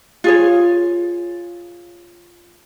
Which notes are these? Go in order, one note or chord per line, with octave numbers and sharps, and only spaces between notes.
F4 G#4 C#5